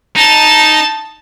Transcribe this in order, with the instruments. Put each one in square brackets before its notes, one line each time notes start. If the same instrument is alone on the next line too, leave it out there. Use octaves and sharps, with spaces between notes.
[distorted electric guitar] D#4 [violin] A5